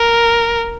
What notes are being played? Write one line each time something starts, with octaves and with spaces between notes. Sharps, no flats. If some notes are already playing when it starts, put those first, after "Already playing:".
Already playing: A#4